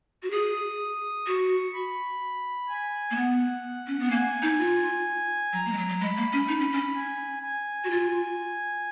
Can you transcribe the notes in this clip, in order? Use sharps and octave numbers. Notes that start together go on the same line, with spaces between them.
F#4
G#4 D#6
F#4 C#6
B5
G#5
A#3
B3 F#5
C#4
B3
A#3 G#5
D#4
F4
F#3 A#5
A#3
G#3
F#3
F#3
G#3 B5
A#3
C#4
D#4
C#4
C#4
G#5
G#5
F#4
F4